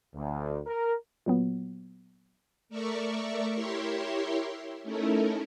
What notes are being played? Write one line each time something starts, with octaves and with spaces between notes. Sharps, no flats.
D2
A#4
A#2 F#3 B3
A3 A#4 D5 E5 C#6
E4 G4 A#4 C#5 E5 C6
A3 C#4 D#4 E4 A4 A#4